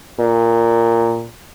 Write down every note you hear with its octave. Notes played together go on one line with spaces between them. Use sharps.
A#2